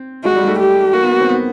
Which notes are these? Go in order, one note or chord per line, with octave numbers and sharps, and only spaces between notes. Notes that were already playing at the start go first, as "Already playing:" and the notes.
Already playing: C4
G#3 F#4
G3
G#3
A3
G4
A#3 F#4
B3
A#3
C4
B3